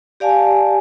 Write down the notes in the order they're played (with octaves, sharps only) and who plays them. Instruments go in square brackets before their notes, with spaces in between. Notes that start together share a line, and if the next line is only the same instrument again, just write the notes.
[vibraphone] G4 D5 F5 G#5 A5